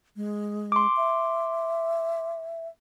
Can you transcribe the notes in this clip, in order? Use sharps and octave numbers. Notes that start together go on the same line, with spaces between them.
G#3
C6 D6
E5